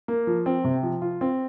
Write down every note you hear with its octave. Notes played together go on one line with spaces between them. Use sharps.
A#3
F3
C4
C3
F3
F4
C4